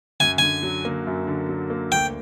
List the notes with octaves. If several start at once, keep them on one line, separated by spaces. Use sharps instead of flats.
F#2 G#5
D3 G#5
F#3
A#3
F#2
D3
F#3
A#3
D2 G5